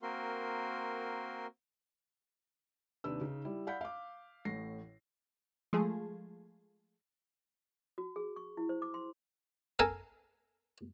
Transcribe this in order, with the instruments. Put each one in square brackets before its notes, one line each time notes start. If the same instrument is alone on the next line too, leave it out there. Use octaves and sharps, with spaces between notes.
[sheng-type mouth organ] A#3 C4 F#4 A#4 C6
[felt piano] D#2 C3 D4 B4 E6
C#3 D#4
G3 E4
D5 F5 F#5 B5 G6 B6
F5 D6
A1 A2 A#6 C7
[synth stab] F3 G#3 A3 G#4
[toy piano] F#4
G#4
C#6
E4
C5
D6
C6
[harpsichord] A4 A#4 G#5 A5